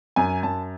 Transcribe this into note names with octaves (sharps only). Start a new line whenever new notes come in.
F#2 G#5
F#2 A5